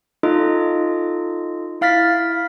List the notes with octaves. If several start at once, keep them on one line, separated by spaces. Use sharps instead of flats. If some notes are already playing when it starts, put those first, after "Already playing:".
D#4 F4 A4 D#5
E4 F5 F6 A6 B6